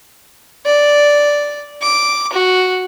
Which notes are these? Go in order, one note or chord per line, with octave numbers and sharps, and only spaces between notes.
D5
D6
F#4